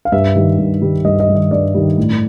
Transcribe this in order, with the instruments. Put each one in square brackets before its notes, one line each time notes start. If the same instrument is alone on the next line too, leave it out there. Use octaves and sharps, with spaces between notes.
[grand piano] F5
G2 E5
D#3 G3
G2
D#3 G3
G2 D#5
D#5
D#3 G3
D#5
G2 D5
D#3 G3
A2